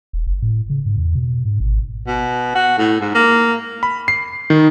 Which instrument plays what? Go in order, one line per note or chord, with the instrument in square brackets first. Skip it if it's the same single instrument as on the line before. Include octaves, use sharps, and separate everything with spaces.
[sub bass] E1
F#1
A2
C#3
G#2
E2
B2
G#2
G#1
[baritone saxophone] B2
F#4
A2
G#2
A#3
[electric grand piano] B5
C7
D#3